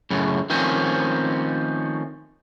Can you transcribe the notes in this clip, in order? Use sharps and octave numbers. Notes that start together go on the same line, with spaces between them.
F#2 A2 C#3
D#3 F3 A3 C4 C#4